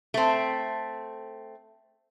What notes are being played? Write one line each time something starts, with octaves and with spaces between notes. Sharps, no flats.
A3 C4